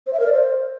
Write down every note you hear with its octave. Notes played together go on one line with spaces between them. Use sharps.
C5
E5
A#4
D5
C5